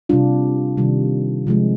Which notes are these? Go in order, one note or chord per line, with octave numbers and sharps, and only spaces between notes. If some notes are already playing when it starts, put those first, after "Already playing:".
C3 G3 D4 F4
C3 D#3 G3
C3 F3 G#3